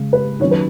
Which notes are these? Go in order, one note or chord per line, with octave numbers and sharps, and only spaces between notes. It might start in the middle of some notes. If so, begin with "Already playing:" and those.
Already playing: C#3 G#3
B4
D#3 F#3 C#4 C#5
B4